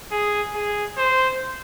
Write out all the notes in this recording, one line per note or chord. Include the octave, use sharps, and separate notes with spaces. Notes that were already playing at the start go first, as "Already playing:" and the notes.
G#4
G#4
C5